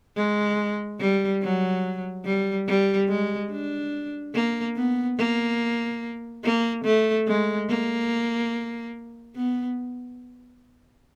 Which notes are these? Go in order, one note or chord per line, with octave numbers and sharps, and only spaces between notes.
G#3
G3
F#3
G3
G3
G#3
D4
A#3
B3
A#3
A#3
A3
G#3
A#3
B3